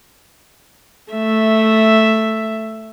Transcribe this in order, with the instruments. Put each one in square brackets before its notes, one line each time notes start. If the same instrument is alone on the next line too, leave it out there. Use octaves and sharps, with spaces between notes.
[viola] A3 E5